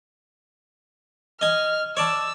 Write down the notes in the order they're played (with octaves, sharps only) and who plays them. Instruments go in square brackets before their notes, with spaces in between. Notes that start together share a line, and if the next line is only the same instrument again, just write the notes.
[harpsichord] D#5 G#5 [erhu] F6
[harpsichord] C#5 D5 A5 [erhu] E6